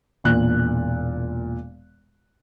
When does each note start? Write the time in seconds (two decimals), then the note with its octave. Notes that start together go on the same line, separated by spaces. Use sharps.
0.24 E1 A#2 F#6